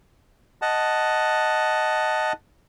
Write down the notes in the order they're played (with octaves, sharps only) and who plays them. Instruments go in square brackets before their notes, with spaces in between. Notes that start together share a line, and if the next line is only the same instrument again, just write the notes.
[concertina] D#5 F#5 A5